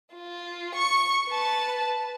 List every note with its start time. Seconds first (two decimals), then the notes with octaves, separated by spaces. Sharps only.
0.14 F4
0.75 C#6
1.28 B4 A5